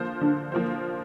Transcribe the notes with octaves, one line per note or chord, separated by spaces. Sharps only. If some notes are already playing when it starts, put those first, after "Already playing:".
Already playing: D3 F3 A#3 F4 C5
D3 D4
F3 A#3 F4 C5